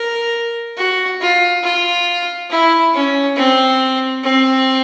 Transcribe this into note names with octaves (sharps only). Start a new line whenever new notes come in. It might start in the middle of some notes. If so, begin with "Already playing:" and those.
Already playing: A#4
F#4
F4
F4
E4
C#4
C4
C4